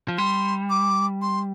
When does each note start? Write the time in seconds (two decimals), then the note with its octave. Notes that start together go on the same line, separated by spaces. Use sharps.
0.08 F3
0.18 G3 C6
0.70 D6
1.22 C6